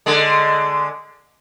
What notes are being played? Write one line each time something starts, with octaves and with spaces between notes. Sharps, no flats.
D3 G#3